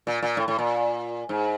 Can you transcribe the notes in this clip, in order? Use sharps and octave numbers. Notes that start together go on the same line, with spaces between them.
A#2
A#2
A2
A2
A#2
G#2